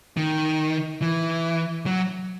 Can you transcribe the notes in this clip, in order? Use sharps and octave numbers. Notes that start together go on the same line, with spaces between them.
D#3
E3
F#3